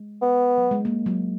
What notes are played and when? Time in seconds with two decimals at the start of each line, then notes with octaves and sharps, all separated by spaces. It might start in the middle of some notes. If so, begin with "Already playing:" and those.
Already playing: G#3
0.22 B3
0.58 F#3
0.71 G#3
0.85 A#3
1.06 F#3